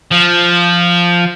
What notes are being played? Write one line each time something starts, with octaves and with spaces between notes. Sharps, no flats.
F3